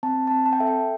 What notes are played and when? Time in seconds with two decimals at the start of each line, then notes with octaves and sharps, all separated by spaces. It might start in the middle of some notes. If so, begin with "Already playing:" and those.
0.03 C4 A5
0.27 C4 A5
0.46 A5
0.53 G5
0.60 A4 E5
0.67 G5